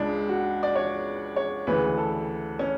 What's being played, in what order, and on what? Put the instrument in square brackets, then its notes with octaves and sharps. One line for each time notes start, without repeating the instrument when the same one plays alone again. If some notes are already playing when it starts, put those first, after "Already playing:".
Already playing: [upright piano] C#2 C#3 G#3 D4
F#4
D5
C#5
C#5
D2 C#3 E3 B4
A4
C#4